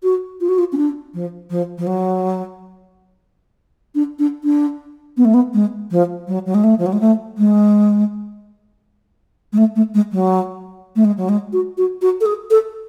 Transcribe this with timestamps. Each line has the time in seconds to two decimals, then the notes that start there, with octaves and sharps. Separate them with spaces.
0.03 F#4
0.41 F4
0.49 F#4
0.58 F4
0.72 C#4
0.77 D4
1.14 F3
1.50 F3
1.78 F3
1.87 F#3
3.95 D4
4.19 D4
4.44 D4
5.17 B3
5.25 A3
5.34 B3
5.54 G#3
5.91 F3
6.28 F#3
6.46 F#3
6.54 G#3
6.64 A3
6.79 F3
6.86 F#3
6.93 G#3
7.01 A3
7.38 G#3
9.53 G#3
9.58 A3
9.76 A3
9.94 G#3
10.12 F#3
10.96 A3
11.05 G#3
11.17 F#3
11.29 G#3
11.53 F#4
11.77 F#4
12.02 F#4
12.21 A4
12.26 G#4
12.50 A4